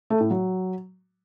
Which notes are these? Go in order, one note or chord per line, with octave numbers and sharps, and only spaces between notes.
A3
A2
F#3